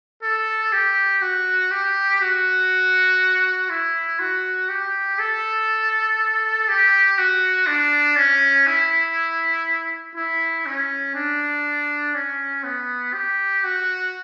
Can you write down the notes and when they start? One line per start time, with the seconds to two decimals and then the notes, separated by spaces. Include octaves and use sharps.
0.22 A4
0.73 G4
1.22 F#4
1.71 G4
2.21 F#4
3.70 E4
4.19 F#4
4.69 G4
5.19 A4
6.68 G4
7.18 F#4
7.67 D4
8.16 C#4
8.67 E4
10.15 E4
10.66 C#4
11.15 D4
12.14 C#4
12.64 B3
13.14 G4
13.64 F#4